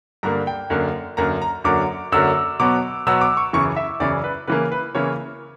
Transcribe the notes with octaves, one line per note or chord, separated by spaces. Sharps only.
G2 D3 A#3 A#5
G5
F#2 D3 A#3
F#2 D3 A#3 A#5
A#5
F#2 D3 F#3 A#3 D6
F#2 D3 F#3 A#3 E6
B2 F#3 B3 D6
B2 F#3 B3 E6
D6
C#6
F#2 C#3 E3 C#6
E5
F#2 C#3 E3 D5
B4
C#3 E3 A#3 B4
B4
C#3 E3 A#3 C#5